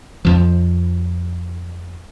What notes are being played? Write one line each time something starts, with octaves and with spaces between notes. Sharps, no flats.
F2 F3